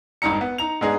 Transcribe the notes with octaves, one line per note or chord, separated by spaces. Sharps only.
G#1 G2 D#4 A#5 C#7
B3
D#4 A#5 F7
G#2 B3 D4 G#4 D#5 A#5